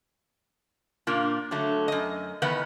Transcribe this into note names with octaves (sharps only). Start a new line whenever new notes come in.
A#2 A#3 D4 F4
D3 F#3 A3
F#2 D#5
D#3 E3 B3 B4 D#5 F#5